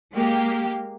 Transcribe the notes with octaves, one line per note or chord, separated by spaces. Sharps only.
G#3 A#3 G4